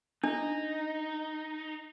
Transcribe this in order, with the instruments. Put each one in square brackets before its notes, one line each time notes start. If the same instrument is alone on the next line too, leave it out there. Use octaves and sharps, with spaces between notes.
[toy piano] D4 [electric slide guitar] D#4